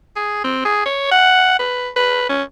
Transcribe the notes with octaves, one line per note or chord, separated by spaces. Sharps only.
G#4
C4
G#4
C#5
F#5
B4
B4
C#4